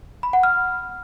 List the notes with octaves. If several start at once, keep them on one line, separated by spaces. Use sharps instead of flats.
B5
F#5
F6